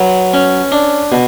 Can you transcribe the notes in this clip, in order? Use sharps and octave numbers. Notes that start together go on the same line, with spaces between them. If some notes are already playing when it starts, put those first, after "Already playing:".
Already playing: F#3 B4
C#4
D4
B2